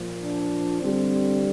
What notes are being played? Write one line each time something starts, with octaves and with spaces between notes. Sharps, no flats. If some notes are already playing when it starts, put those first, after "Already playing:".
Already playing: A#2 F3
D4
D3 G3 C4